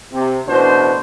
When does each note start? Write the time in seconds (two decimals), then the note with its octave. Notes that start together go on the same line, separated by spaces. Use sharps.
0.12 C3
0.47 A1 B2 D4 C5